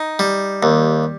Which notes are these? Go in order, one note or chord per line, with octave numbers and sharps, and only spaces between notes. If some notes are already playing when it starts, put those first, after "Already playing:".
Already playing: D#4
G3
D#2